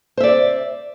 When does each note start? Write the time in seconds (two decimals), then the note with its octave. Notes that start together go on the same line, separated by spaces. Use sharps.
0.17 C5
0.20 E5
0.23 D5